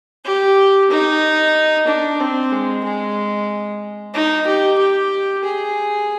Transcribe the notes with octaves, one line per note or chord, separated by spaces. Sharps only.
G4
D#4
D4
C4
G#3
G#3
D#4
G4
G4
G#4